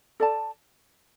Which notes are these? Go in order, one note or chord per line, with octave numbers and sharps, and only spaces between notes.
A4 D5 A5